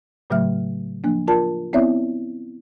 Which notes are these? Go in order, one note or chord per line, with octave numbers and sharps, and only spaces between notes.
A2 C#3 F#3 A3 E5 F6
F3 A#3 D4
F4 A#4 D5 A5
B3 C4 E4 C#5 D5 E5